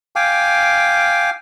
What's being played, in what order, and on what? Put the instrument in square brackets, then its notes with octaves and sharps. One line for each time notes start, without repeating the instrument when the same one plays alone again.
[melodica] F5 G5 G#5 D6